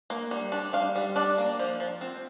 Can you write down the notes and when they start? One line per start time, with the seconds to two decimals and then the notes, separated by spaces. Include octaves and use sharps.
0.10 A#3
0.31 G3
0.52 D4
0.73 G3 F5
0.96 G3
1.16 D4 D5
1.38 A#3
1.59 F3
1.80 F3
2.01 C4